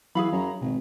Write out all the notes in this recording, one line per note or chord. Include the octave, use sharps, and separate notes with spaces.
E3 F#3 G#4 F5 B5
F#2 A#5
G#1 B2